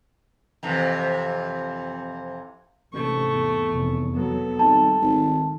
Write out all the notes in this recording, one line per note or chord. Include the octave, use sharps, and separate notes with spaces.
F2 C3 E3
A1 G#2 C3 A3 C#6
E2
F1
F#3 B3 A4
G#1 G3 A5
G#1 D#3